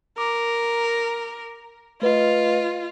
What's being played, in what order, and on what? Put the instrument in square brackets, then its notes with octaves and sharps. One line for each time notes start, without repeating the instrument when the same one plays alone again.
[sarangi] A#4 [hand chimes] D6
[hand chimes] A3 B4 D#5 [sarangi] F4